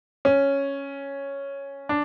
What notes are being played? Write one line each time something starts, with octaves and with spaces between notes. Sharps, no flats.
C#4
D4